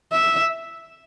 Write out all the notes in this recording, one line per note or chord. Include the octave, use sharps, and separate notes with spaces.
E5